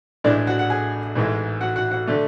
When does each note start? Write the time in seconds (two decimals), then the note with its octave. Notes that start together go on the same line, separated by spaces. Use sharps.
0.24 A1 A2 E3 G#3 D4 D5
0.47 F#4 F#5
0.59 F#5
0.70 G#4 G#5
1.15 A1 G#2 E3 G#3
1.61 F#4 F#5
1.76 F#4 F#5
1.91 F#4 F#5
2.08 D3 A3